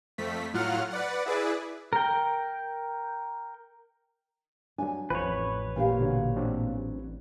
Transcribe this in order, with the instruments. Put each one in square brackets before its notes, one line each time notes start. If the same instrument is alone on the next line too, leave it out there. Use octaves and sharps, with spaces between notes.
[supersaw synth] F2 A3 B6
A2 F#3 F4 F#5 F6
B4 D5 F#5
E4 G#4 B4 D5
[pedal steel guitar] A#4 G5
[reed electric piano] F#3 D4 [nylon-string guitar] G#5
[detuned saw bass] A1 [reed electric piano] F2 F3 [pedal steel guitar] B4 C#5
[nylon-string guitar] A#2 G4 F5
[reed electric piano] B2 D3 F#3
F#3 C4 D4